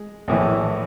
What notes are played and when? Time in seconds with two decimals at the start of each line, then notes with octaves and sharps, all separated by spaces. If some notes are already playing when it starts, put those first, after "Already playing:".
Already playing: G#3
0.28 A#1 A2 E3